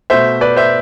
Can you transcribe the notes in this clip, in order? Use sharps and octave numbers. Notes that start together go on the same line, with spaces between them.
B2 A3 C5 E5
B4 D5
C5 E5